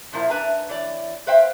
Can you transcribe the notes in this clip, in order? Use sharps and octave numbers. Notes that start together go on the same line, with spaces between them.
F#2 A#2 F3 E4 A#4
D4 B4 E5 G#5 A#5
E3 C#5 D5
B4 C5 E5 F5 G5